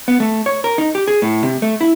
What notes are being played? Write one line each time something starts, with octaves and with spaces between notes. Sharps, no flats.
B3
A3
C#5
A#4
D#4
G4
G#4
A2
C3
A3
E4